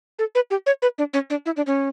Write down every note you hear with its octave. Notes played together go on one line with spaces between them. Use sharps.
A4
B4
G4
C#5
B4
D4
C#4
D4
E4
D4
C#4